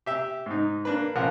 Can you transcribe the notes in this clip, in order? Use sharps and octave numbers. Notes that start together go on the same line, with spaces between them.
G4 E5 E6
G#2 D#4
A#3 D4 B4
A#1 F3 F4 A#4 F#5